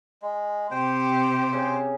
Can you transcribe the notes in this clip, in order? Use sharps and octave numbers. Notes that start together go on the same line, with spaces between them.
G#3
C3 G4 C5 G5
C#3